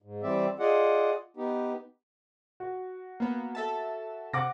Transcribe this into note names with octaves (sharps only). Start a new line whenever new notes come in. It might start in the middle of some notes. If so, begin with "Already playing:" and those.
G#2
E3 G3 C4 D5 E5
F4 G#4 D5 D#5 F#5
B3 D#4 G4
F#4
A#3 B3
A4 E5 A5
C3 F#5 D6 A#6